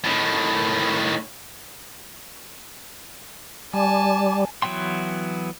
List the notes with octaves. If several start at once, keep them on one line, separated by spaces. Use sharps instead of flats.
A2 D#3
G3 G#5 A5
E3 F#3 B3 G5 C6